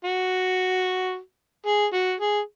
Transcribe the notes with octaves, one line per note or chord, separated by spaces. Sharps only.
F#4
G#4
F#4
G#4